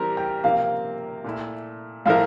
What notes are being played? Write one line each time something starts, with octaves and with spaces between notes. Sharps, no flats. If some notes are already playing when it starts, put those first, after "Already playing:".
Already playing: E3 G3 C4 G4 A#4 A#5
G5
C3 F3 A#3 F5
A#2 A3 E4
A2 F3 A3 E4 A#4 F5